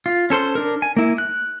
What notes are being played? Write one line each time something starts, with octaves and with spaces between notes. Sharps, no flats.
F4
C#4 A4 C5 C6
D4 A#4
G#5
A#3 E4
F#6